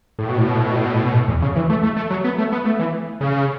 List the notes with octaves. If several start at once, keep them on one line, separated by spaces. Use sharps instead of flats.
A2
B2
A2
B2
A2
B2
A2
B2
A2
B2
A2
E2
C#3
E3
A3
A3
A3
F#3
B3
A3
B3
A3
E3
C#3